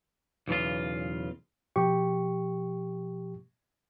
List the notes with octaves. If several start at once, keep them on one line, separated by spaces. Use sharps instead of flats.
B1 E2 C#3 F4
B2 F3 G4 C#6